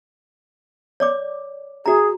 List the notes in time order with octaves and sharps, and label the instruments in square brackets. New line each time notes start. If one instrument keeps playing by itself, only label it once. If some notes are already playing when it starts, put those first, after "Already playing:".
[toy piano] C#5 D5 D6
[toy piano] F#4 A#5 [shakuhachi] G#4